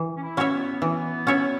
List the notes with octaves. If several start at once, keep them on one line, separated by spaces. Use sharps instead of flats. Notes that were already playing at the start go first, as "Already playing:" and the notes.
Already playing: E3
C#4
E4
C#4 F#4 C#5 E5
B3
E3
C#4 F#4 C#5 E5